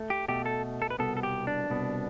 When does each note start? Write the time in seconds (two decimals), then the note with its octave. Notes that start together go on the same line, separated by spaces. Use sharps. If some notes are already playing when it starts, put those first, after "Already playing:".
Already playing: A3
0.10 G4
0.28 B2 A3 G4
0.46 A4
0.82 A4
0.90 B4
0.99 C2 B2 B3 A4
1.17 A4
1.23 G4
1.47 D4
1.70 C2 B2 B3